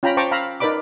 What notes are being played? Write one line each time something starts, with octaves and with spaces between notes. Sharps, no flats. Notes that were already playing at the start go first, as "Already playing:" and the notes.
C#4 F4 G5 A#5 B5
C5 G5 A5 A#5 C#6 D6
F5 A#5 B5 E6
D#4 A#4 B4 D5 B5 D6